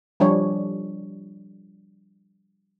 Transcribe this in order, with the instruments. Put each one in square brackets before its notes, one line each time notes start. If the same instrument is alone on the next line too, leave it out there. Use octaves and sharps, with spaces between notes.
[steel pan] F3 G3 D4 C#5